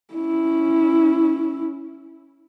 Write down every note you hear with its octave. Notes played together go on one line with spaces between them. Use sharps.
C#4 E4